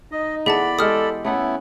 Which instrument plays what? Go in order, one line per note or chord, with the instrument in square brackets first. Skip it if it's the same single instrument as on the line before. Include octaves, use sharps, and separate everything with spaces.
[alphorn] D#4 [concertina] D#5
[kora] E3 B3 A4 [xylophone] G#4 F#5 A5 [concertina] D5 B5
[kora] G#3 G4 [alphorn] A4 [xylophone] D#6 F6
[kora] A3 A4 F#5 [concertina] B3 E4 [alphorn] C#4